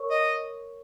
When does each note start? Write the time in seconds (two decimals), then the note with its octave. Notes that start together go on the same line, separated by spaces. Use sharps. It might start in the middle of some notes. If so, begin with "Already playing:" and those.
Already playing: A#4 C#5 C#6
0.10 D#5